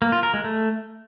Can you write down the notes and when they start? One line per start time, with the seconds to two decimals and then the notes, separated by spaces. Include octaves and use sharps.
0.02 A#3
0.12 F4
0.23 A#4
0.34 G#3
0.44 A3